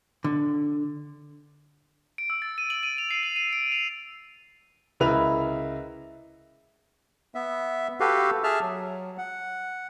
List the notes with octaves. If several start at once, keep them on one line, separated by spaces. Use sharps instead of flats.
D3
D7
E6
A6
D#7
F#7
D#7
F7
C7
D#7
D#7
D7
F7
C#2 E4 A#4 B4 F7
B3 E5
F#4 G4 A4 B4 F5
G#4 E5 A5 F6
F#3
F#5